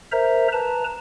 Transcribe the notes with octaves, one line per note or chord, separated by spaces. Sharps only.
A#4 C5 E5 A#5
B4 A5 A#5